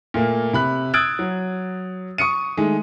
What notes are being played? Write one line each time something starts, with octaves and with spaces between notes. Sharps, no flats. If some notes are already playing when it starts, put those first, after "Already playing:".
A#2 A3 A#3
C3 B5 F#6
D#6 E6 F#6 G#6 A6 D7
F#3
C#6 D#6 C#7 D#7
D#3 G#3 A3